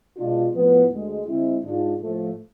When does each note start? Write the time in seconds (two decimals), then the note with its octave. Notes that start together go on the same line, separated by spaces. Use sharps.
0.17 B2 G#3 D4 F4
0.53 A2 F3 B3
0.90 D2 D3 G#3
1.26 D3 G#3 C4 E4
1.64 G#2 G#3 D4 F4
2.00 A2 F3 A3